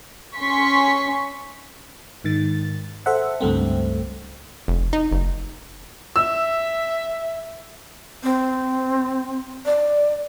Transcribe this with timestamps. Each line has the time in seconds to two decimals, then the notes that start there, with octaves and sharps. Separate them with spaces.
0.35 C#4 C6 C#6 B6
2.24 G#2 D#3 A6
3.06 A4 C5 E5 F#5
3.41 C#2 G2 A3 C4
4.68 F1
4.93 D#4
5.12 F#1
6.16 E5 E6
8.23 C4
9.66 D5